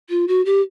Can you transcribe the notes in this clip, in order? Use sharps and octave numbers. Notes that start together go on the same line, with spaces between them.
F4
F#4
G4